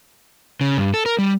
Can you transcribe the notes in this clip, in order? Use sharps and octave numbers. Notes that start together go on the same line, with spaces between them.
C#3
G2
A4
A#4
G3